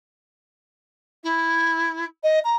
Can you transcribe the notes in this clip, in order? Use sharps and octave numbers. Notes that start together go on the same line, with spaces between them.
E4
D#5
A#5